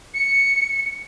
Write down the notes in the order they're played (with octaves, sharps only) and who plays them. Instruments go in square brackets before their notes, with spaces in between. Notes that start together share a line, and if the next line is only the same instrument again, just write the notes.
[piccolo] C#7